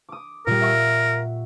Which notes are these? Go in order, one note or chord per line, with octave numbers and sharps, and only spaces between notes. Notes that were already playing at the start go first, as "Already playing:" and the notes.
D6 D#6
A#2 G3 A#4
E5 F#5 C#6